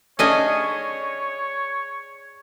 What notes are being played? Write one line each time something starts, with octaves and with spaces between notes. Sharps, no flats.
A3 C#4 D4 G#4 C#5 D#5 G#5